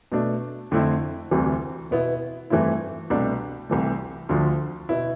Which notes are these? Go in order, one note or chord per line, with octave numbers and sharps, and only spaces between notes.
B2 A3 D4
F2 D3 A3 C4 E4
D2 C3 E3 G3
B2 B3 E4
G2 E3 A3 C4 E4
C2 B2 A3 D4
C2 C3 E3 A3
D2 D3 F3
B2 B3 E4